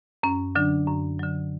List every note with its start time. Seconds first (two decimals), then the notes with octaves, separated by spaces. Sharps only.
0.23 F#2 C#4
0.55 D3 F#3 D4
0.88 F#2
1.19 D3 F#3